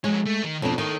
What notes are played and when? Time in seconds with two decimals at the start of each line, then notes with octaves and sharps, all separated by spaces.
0.04 F2 G#3 C#4
0.26 A3
0.43 D#3
0.62 F2 B2 D4
0.78 D#3 A4 C#5